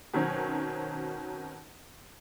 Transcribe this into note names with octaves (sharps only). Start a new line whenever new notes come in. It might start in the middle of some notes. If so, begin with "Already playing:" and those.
B2 D#3 F#3 C4 C#4